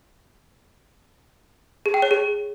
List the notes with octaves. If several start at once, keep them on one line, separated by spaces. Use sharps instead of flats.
G#4
G5
C#5
G#4